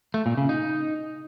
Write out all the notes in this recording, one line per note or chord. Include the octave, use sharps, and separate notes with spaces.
A3
A#2
C#3
D#4